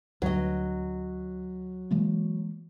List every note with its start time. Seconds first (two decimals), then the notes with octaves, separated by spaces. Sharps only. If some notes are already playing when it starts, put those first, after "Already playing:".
0.22 D2 F#3 D#5
1.91 E3 G#3 A#3